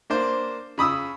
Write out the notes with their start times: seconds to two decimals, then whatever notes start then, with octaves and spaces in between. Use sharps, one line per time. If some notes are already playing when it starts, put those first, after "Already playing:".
0.10 A#3 D4 C5
0.78 C#3 B5 D#6 E6